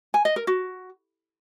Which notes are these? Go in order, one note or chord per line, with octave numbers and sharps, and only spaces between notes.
G#5
D#5
A#4
F#4